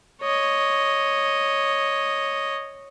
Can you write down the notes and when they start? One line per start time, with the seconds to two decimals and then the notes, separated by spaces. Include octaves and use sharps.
0.22 C#5 D#5